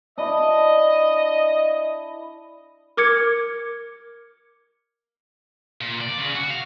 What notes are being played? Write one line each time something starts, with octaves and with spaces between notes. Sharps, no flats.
D4 E4 D#5
A#4 D6 G#6 C#7
A#2
D5
C#3
F#4
F5